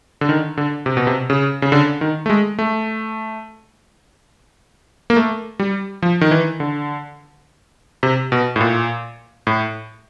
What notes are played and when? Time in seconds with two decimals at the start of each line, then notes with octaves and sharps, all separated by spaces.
0.21 D3
0.29 D#3
0.57 D3
0.86 C3
0.97 B2
1.07 C3
1.30 C#3
1.62 C#3
1.72 D3
2.01 D#3
2.26 A3
2.30 G#3
2.59 A3
5.10 A#3
5.16 A3
5.59 G3
6.02 F3
6.21 D#3
6.31 E3
6.60 D3
8.03 C3
8.32 B2
8.56 A2
8.61 A#2
9.47 A2